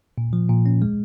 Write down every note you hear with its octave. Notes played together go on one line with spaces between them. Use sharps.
A#2
F3
A#2
C#4
G#3